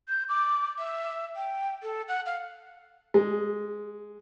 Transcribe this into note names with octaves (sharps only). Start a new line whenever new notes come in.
G6
D6
E5
G5
A4
F#5
F5
G#3